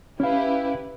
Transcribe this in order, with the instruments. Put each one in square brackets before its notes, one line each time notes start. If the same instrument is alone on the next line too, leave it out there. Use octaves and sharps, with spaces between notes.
[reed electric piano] C#4 F5 [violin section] E4 G4 B4